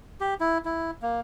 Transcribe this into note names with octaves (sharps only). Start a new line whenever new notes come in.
G4
E4
E4
A#3